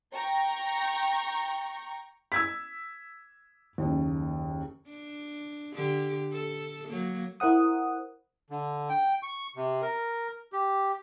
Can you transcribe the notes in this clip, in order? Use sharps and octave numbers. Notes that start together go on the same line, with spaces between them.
G5 A#5 C#6
E6 G#6 B6
F#1 D#2
D4
D3 G4
A4
F#3 A#3
E4 A#4 C5 F#5 D#6
D3
G5
C#6
C3
A#4
G4